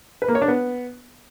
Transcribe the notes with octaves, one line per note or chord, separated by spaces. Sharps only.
B4
A#3
C#5
D4
B3